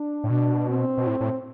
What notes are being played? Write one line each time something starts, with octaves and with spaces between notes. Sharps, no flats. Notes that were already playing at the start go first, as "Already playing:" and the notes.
Already playing: D4
A2
B2 D4
C4
B2
A2
A2